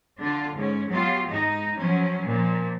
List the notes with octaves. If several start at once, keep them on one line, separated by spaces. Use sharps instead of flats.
D3 D4 F4
G#2 C#4
F#3 B3 F4 G4
G#2 D#4
F3 F#3 C#4
A#2 F3